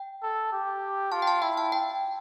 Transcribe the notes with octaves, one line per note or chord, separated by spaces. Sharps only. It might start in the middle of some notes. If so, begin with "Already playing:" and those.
Already playing: G5
A4
G4
F4 A5
G5
A5
E4 G5
A5
G5